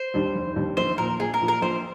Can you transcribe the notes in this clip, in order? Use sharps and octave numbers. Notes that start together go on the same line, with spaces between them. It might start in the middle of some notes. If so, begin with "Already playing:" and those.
Already playing: C5
D#2 D#3 G3 D4
F1
D#2 D#3 G3 D4
A#1 C5
A#2 F3 A#3 A#4
A#1 G#4
A#4
A#2 F3 A#3
A#4
A#1 C5